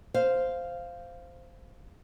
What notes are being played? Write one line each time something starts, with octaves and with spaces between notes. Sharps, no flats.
C5 F5